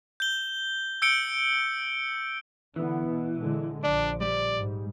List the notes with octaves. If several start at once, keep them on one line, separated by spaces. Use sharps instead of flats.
G6 G7
E6 G6 C#7 D7 G7
D3 E3 B3
B2
A#2 D3 G#3
A#1 F3 D4 D5
G3 D5
G#2